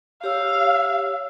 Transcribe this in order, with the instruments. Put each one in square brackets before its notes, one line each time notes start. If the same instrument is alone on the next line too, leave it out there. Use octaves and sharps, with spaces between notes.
[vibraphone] G4 C#5 E6 [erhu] F5